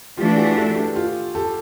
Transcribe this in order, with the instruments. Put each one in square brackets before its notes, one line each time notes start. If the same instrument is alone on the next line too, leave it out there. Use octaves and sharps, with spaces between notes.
[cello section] E3 A3 D4 [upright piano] F4 G4
[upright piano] F#4 G#4
G4 A4
G4 A4
F4 G4
G4 A4